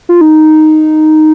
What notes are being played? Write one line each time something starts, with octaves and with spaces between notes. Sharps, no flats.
F4
D#4